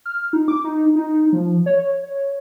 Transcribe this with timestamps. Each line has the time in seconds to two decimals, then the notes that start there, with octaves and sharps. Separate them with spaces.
0.06 F6
0.33 D#4
0.48 D6
0.64 D#4
0.95 D#4
1.33 F3
1.66 C#5
2.03 C#5